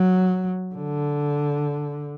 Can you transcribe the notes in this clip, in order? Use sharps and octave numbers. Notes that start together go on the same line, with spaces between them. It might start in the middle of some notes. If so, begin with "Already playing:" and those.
Already playing: F#3
D3